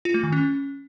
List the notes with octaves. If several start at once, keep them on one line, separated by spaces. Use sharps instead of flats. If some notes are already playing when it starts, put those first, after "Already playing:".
F4
A3
D#3
C#4